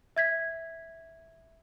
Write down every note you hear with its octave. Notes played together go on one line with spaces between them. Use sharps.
E5 G#6 B6